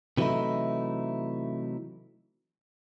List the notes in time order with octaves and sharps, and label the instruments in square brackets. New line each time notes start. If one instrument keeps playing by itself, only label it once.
[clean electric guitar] C3 E3 F#3 A3 D#4 E4